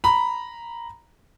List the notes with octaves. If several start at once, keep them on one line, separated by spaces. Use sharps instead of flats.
A#5 B5